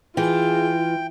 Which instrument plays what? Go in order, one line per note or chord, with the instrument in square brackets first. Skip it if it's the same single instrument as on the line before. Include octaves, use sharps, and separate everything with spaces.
[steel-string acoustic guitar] E3 [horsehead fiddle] F4 [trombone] G#4 [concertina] G5